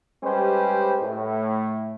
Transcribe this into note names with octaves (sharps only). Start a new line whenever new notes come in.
G3 G#3 C#4 G4 B4 C5
A2